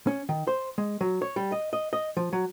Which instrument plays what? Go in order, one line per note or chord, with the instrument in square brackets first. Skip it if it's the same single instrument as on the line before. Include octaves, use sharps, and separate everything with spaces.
[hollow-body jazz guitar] C#4
D#3
C5
G#3
F#3
C#5
G3
D#5
D#5
D#5
F3
F#3